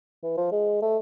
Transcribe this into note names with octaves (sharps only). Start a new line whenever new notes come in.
E3
F3
G#3
A3